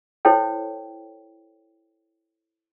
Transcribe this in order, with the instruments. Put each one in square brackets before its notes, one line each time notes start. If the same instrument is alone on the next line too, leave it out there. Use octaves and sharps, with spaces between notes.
[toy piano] E4 A4 C5 C#5 G5